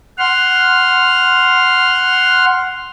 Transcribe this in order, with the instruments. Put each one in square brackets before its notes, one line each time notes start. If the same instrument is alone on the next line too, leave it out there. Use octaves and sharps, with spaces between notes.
[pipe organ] F#5 C6 F6